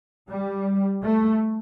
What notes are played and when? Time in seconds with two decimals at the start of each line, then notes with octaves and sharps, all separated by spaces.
0.30 G3
1.03 A3